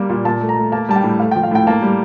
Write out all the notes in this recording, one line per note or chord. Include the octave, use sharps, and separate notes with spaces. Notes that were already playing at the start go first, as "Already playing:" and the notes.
Already playing: G3 A#3
A#2
A#2 A5
A3
A#5
A3
A#3 A5
G3 A5
G5
A2
A3 F5
G5
F3
F5
A2 G5
A#3 A5
G3